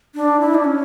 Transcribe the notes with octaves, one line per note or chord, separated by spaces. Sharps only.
D4
E4
D4
C#4